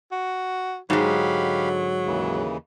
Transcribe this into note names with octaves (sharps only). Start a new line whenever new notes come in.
F#4
G#2 D3 F#3 G#3 G4 F5 B5
D#2 C#3 E3